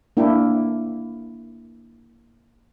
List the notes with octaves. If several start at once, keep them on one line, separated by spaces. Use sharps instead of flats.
A#3 D4 E4 G5